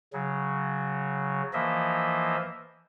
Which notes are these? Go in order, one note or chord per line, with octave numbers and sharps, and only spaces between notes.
C#3 F#3
E3 F3 A#3 D#5 E5